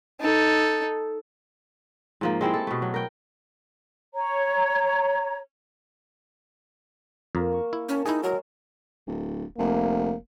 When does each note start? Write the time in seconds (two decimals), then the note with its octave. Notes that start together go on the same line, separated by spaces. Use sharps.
0.20 D#4 A4
2.21 G#2 F3 A#3
2.41 G#3 C4 E4 G4
2.54 A4
2.67 B2 A3
2.82 F#3
2.94 A#4 G5
4.14 C#5 A#5
7.35 F2 A#3 A#4
7.52 C#6
7.73 E4
7.89 C#4 G4 A#4 A5
8.06 D#4 E4 G#4 C#5
8.23 F#3 G#3 A#4
9.07 D1
9.58 F1 A#3